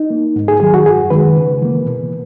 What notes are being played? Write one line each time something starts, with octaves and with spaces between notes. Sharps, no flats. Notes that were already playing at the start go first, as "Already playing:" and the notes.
Already playing: D#4
A#3
G#2
G#4
D#3 F#3 G#4
F#4
F#2 G#4
D#3 G#3 B4
C#3
E3 A#3
B2